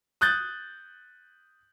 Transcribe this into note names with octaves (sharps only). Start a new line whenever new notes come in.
D#6 F#6 G6 A6